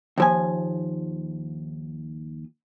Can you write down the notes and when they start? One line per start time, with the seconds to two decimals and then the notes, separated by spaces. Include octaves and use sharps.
0.18 D#2 F3 G#5